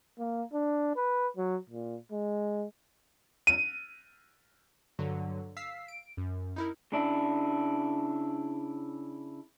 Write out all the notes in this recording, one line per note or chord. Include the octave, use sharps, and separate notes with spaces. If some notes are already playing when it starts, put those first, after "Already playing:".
A#3
D4
B4
F#3
A#2
G#3
D#7
G2 D3 F#3 F#4
F5 E6 B6 C7
D7
F#2
D#4 E4 A#4
C#3 D4 E4